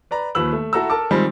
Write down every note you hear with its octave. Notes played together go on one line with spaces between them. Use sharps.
B4 D5 A#5
D#2 D#3 F3 B4 E6 F#7
A3
E4 F#4 A4 A#5 E6
A4 A#4 A5 D6
D#3 F3 G3 G#3 C4